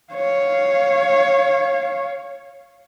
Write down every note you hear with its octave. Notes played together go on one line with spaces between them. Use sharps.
C#5 F5